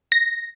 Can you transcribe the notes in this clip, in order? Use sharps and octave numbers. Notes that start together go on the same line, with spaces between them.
A#6